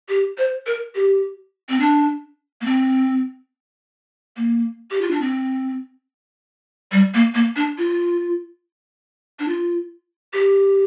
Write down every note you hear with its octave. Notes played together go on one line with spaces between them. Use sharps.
G4
C5
A#4
G4
C4
D4
A#3
C4
A#3
G4
F4
D4
C4
G3
A#3
A#3
D4
F4
D4
F4
G4